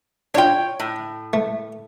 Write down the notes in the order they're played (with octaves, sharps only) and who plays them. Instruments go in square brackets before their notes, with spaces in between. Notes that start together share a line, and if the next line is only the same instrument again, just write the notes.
[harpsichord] D4 F4 [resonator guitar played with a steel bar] C#5 G5
[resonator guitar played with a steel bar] A2
[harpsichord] A3